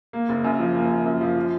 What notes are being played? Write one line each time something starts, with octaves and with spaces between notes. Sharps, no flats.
A#3
F#1
F#2
F3
A#3
F#1
F#2
F3
F4